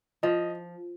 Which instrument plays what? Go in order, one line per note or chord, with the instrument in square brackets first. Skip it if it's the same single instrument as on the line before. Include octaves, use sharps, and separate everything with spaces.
[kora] F3 [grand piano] D#5